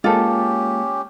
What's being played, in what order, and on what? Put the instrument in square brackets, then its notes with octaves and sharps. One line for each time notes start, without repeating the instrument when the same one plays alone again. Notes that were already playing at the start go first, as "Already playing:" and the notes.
[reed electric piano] G#3 A#3 [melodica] C#4 G4 [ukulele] F4 A4